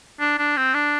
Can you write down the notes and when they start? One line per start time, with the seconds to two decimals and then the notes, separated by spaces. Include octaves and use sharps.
0.20 D4
0.38 D4
0.57 C4
0.74 D4